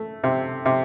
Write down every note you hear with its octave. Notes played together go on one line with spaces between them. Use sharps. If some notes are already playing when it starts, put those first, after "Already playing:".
Already playing: A3
C3
C3